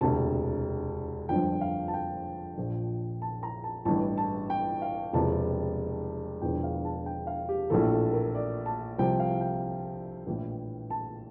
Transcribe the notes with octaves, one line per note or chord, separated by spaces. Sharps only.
E1 D2 C3 A5
G1 F2 D3 F3 G5
F5
A5
G5
A#1 A#2 F3
A5
A#5
A5
A1 G2 E3 A5
A5
G5
F5
E1 E2 C3 F3 A5
E1 E2 D3 F3 G5
F5
A5
G5
F5
G4
A#1 A2 E3 A4
A4
A#4
D5
A5
C2 C3 F3 G5
F5
G5
A#1 A2 E3
A5